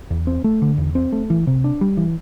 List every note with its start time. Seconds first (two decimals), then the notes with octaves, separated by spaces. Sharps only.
0.10 E2
0.27 C4
0.44 A3
0.62 D3
0.78 E2
0.95 C4
1.12 A3
1.30 E3
1.47 C3
1.64 D4
1.81 G3
1.97 E3